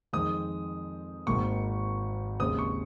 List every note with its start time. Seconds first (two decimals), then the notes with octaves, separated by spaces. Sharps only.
0.13 F2 D#3 G#3 C4 D#6
1.26 G#1 G#2 D#3 A#3 C#6
2.39 D#2 C#3 G#3 C4 D#6
2.59 C#6